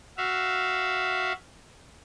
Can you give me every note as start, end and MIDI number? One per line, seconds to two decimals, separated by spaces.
0.17 1.33 66
0.17 1.33 76
0.17 1.33 77